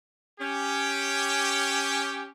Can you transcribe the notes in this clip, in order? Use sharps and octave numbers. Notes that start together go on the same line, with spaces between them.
C#4 G4